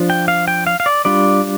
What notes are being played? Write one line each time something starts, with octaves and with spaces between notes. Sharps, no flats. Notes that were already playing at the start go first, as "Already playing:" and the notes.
Already playing: F3 D4 F4
G5
F5
G5
F5
F5
D5
G3 D4 F4 D5